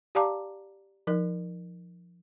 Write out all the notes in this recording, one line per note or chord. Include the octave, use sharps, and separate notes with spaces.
G4 D5 F5 A5 A#5 D6
F3 D#4 A#4